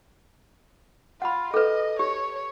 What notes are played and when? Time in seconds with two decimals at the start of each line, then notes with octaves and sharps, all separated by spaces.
1.22 F4 F#5 B5
1.54 A4 B4 D#5
1.99 G4 C#5